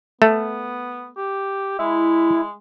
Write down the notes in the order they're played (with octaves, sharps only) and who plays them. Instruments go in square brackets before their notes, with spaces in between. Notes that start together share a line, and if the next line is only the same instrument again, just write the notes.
[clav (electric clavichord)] A3 [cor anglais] B3
[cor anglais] G4
[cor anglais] G#3 [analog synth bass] E4